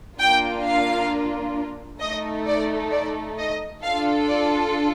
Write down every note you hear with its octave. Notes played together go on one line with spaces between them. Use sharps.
A#3 D4 F4 G5
F5
A3 D#4 A4 D#5
D5
D5
D#5
D4 F4 A4 F5
D5